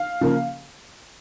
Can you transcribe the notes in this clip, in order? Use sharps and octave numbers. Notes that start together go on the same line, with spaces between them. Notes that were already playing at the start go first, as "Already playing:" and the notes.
Already playing: F5
C#3 F3 A#3